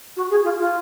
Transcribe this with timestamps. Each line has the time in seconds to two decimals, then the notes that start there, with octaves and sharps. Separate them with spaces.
0.16 F#4
0.30 G#4
0.44 F4
0.59 F4